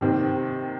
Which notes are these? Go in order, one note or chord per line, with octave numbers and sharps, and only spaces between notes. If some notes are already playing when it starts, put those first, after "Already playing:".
C3 D#3 C4